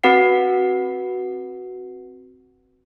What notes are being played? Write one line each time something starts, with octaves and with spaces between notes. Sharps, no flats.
C4 F#4 B4 F#5 C7